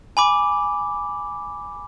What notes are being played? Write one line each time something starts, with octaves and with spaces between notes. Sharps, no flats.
G#5 B5 D6